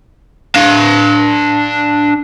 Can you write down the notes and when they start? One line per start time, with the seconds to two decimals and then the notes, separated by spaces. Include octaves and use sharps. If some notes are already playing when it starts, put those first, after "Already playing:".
0.56 D4 F5